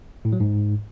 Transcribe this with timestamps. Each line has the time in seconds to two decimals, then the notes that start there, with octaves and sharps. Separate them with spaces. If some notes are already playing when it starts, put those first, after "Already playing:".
0.25 A2
0.33 F#3
0.40 G#2